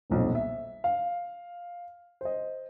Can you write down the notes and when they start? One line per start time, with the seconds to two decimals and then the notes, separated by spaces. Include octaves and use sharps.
0.10 D#1 B1 F2
0.35 E5
0.84 F5
2.21 C5 D#5